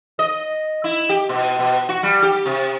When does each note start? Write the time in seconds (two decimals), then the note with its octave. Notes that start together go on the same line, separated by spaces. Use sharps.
0.19 D#5
0.84 E4
1.09 G4
1.29 B2
1.59 B2
1.89 F#4
2.03 G3
2.22 G4
2.46 C3